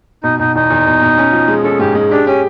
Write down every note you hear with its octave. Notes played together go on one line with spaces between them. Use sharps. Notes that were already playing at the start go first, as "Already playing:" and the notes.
B2 D#4
B2 D#4
E2 D#4
E2
B2
B2
C#4
F3
G#3
C#4 A4
G#2 G4
G#3
D4 G4
C#4 G4